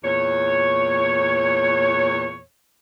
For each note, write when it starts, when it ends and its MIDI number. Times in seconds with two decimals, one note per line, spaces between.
0.04 2.41 40
0.04 2.41 46
0.04 2.41 73